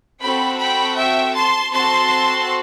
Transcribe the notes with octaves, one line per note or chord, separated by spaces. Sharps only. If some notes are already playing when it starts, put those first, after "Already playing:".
C4 F#4 A4 G5 B5
G5 B5
E5 G5
A5 C6
C4 F#4 A4 A5 C6